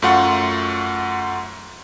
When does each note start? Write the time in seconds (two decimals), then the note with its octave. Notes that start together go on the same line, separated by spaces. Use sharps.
0.02 F#2 A3 F4 F#5 C#6